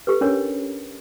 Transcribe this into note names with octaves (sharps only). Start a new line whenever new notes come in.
G4 A4 B4
C#4 D4 A#4 C#5